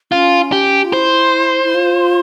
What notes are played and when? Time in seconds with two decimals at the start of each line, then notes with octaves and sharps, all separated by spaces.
0.12 C#4 F4
0.52 G4
0.85 F4
0.93 E4 C5
1.64 E4
1.74 F4